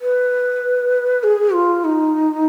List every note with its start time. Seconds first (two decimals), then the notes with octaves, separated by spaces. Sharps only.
0.01 B4
1.24 G#4
1.54 F4
1.84 D#4